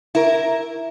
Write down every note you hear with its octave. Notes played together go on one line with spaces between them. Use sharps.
E4 A#4